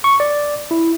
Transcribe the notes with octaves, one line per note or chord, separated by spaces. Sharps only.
C#6
D5
E4